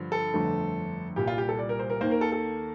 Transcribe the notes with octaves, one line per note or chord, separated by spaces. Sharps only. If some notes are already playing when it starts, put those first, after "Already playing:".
Already playing: G2 D3 F3
A4
G1 F2 D3 A3
C2 A#2 G3 G4
F4
G4
A4
D5
A#4
C5
A#4
D#2 D#3 A#3 C5
A#4
A4
A4